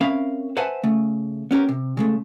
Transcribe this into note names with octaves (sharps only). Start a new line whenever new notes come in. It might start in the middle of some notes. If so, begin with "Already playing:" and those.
C4 C#4 A#4 E5 F5 B5
B4 C5 E5 F#5 G#5 A5
C#3 A3
B3 C#4 G4 A#4
C3
C#3 G#3 A3